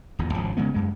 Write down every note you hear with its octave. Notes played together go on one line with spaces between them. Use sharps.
D1 E2 A#2
G#1 C#3 F3
C#3 E3 G#3 B3
F#2 G#3